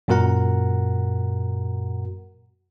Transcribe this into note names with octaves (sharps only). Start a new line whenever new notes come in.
F#2 A#2 F#4 A#4 F#5 A#5